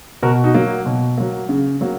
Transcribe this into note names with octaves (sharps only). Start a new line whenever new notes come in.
B2 F#4 A#4
D#4 F#4
F#3 A#3
B2
F#3 A#3
C#3
F#3 A#3